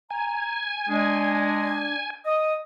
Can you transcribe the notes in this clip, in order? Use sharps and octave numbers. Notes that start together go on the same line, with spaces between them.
G#5 A#5
G#3 D4
D#5 D#6